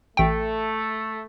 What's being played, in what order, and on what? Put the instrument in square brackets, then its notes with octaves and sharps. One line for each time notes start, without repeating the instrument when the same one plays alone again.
[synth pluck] A1 G5 [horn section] A3